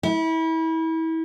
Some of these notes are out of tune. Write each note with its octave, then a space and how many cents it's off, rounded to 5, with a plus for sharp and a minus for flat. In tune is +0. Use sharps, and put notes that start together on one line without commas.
E4 -30